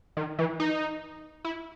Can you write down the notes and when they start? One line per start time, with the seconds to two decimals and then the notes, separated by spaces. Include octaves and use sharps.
0.17 D#3
0.39 E3
0.60 D#4
1.45 E4